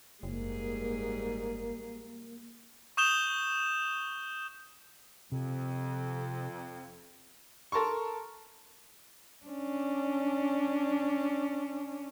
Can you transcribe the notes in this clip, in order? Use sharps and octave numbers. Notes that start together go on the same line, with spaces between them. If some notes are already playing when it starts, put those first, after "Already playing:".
F#1 G#2 G3 A#3 G#4
C#6 D#6 G6 E7 F7 G7
F2 C3
A4 A#4 A5 C6 C#6
C#4 D4